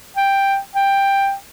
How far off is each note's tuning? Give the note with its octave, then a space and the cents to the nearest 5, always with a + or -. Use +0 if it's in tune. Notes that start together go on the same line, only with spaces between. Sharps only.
G5 +5
G5 +10